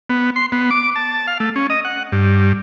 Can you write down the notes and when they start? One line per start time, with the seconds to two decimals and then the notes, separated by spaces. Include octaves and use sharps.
0.10 B3
0.36 C6
0.52 B3
0.71 D6
0.96 A5
1.27 F5
1.40 A3
1.56 C#4
1.70 D#5
1.85 F#5
2.12 G2